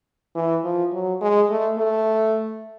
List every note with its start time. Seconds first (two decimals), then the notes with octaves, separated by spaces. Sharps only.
0.35 E3
0.64 F3
0.93 F#3
1.21 G#3
1.50 A3
1.78 A3